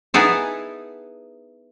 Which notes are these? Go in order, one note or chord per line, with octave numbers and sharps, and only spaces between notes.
B3 D#4 E4 G#4 A4